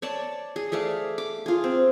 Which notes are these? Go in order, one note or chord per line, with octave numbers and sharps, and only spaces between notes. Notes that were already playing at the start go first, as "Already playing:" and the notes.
C#5 D5 A5
G#4
A3 G#4 D5 F5
D6
F4 G#4
C4